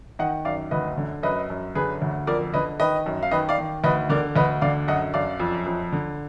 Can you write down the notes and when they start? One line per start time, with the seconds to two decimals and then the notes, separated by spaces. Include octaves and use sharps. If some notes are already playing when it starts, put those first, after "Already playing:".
0.19 D#3 D#5 F#5
0.45 F#2 D5 F5
0.71 D2 B4 D#5
0.97 D3
1.23 F#2 B4 D#5
1.50 F#2
1.75 D3 G#4 B4
2.02 D2
2.27 F2 A#4 D5
2.54 D3 B4 D#5
2.80 D#3 B4 D#5
3.06 F#2
3.23 F5
3.31 D#3 B4 D#5
3.49 D5 F5
3.58 D#3
3.83 D2 B4 D#5
4.09 D3 A#4 D5
4.36 D2 B4 D#5
4.61 D3 D5 F5
4.88 F#2 D#5 F#5
5.14 F#2 D5 F5
5.40 F2
5.66 F2
5.92 D3